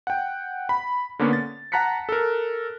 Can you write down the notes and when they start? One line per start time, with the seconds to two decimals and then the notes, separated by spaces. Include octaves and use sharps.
0.07 F#5 G5
0.69 B5
1.19 D3 A#3 B3 C#4
1.33 A6
1.72 F#5 A5 A#5 F#6 B6 C#7
2.09 A4 A#4